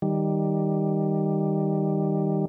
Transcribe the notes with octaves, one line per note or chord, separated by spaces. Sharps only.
D#3 G3